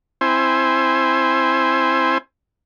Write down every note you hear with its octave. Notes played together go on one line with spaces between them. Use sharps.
C4 E4 C5 G#5